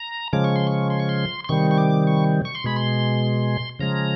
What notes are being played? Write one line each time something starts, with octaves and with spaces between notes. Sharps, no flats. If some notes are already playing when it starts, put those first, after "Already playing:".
Already playing: A#5
C#3 F3 G#3 D6
C#6
C6
C#6
C6
C#6
C6
C6
C3 D#3 G3 C#6
C#6
D6
C#6
C#6
C6
B2 G#3 B5
C6
C#3 F3 G#3 A#5